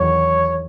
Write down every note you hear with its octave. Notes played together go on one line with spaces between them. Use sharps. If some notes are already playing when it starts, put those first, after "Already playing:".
Already playing: E2 D#3 F#3 C#5